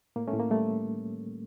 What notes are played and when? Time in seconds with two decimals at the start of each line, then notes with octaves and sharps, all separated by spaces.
0.16 A2 A#3
0.28 A3 C#4
0.33 A2
0.40 A#3
0.51 G3 A3